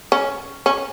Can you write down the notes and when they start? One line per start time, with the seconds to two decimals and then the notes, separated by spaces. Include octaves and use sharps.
0.12 C#4
0.66 C#4